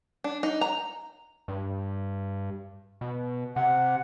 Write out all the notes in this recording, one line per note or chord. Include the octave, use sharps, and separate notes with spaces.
D4
D#4
A#5
G2
B2
C3 F#5